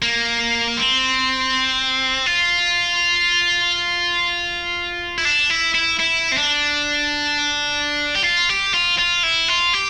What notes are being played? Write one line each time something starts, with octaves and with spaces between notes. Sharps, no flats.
A#3
C4
F4
E4
D4
E4
E4
E4
C4
D4
G4
F4
G4
F4
F4
E4
F4
G4